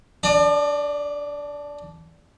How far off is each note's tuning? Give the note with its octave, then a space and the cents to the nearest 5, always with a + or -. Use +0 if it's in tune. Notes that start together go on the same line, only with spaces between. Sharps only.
D4 -15 D5 +40